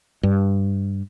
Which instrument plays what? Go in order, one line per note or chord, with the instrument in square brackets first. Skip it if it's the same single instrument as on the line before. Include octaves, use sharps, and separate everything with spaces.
[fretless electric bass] G2